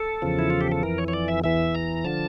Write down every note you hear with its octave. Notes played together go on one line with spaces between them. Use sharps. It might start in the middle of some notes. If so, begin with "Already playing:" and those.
Already playing: A4
E2 C#3 F3
E4
F4
G4
A4
F2 E3 A#4
C#5
C#5
D5
E5
E2 E3 E5
A#5
D3 F3 A5